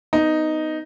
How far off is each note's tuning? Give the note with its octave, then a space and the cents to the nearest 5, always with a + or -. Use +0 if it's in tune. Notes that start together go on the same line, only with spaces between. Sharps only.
B3 +25 D#4 +0